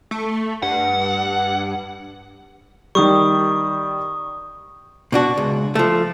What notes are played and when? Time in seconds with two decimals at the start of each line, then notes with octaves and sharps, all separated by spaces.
0.11 A3
0.62 G2 F#5
2.95 D#3 G3 C#6 D#6
5.12 B2 D4 F#4
5.38 C#2
5.75 F3 A3